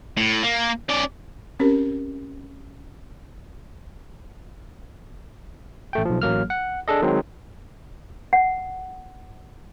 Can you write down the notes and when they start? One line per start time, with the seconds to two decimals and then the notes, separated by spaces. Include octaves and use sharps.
0.17 A2
0.43 A#3
0.89 C#4 D5
1.60 C4 C#4 G4 A#4
5.93 A1 A3 G5
6.05 B1 F3
6.22 A1 F#3 A#3 F6
6.50 F#5
6.88 D4 G#4 A4 D#5
7.02 D#3 F#3 G#3 C4
8.33 F#5